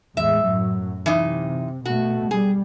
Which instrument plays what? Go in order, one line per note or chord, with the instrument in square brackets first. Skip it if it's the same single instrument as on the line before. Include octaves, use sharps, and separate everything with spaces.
[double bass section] E2 A2 G#3 [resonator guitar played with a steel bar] E5
[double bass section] F#2 A2 F#3
[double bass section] C3 [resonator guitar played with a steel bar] E3 D#4
[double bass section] B2 A3 [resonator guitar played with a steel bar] F#4
[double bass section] G3 [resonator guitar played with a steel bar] G#4